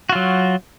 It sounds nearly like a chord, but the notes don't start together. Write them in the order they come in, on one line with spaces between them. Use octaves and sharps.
F#4 F4 F#3